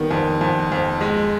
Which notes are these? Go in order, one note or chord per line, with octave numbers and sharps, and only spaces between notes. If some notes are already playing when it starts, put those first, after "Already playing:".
Already playing: D#3 G3 B3
F2
F2
F2
G#3